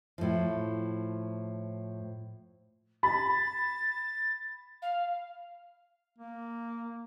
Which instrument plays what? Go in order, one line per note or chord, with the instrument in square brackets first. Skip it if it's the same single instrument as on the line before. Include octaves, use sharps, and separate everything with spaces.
[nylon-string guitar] A2 F3
[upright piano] B5 [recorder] A6
[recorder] F5
[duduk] A#3